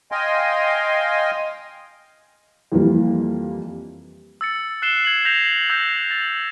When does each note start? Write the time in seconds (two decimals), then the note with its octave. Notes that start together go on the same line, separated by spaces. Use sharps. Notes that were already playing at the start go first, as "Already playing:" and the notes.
0.12 D#5 F5 G5 G#5 C6
2.72 F2 E3 G3 A#3
4.41 E6 A6 C#7
4.82 F#6 C7 E7 G7
5.05 G#6 F#7
5.25 G6 A#6 C7 F7
5.70 E6 G6 A#6 C7 F#7
6.11 A6